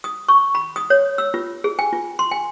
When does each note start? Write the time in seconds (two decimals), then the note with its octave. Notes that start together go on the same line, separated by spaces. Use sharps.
0.04 D#6
0.29 C#6
0.55 B5
0.76 D#6
0.90 C#5
1.18 E6
1.34 F4
1.64 G#4
1.79 G#5
1.93 F4
2.19 C6
2.31 G#5